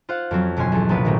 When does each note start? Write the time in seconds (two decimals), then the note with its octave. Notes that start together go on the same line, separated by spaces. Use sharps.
0.09 F4 C5 F5 F#5
0.31 F2 F#3 C4 C#4
0.57 G1 B2 C#4 G#5 C6
0.72 E2 A4
0.89 A#1 C3 F3 C#4 B4
1.04 A#2 D#3 F#3 A3 A#3 C4